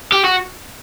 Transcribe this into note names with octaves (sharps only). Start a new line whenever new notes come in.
G4
F#4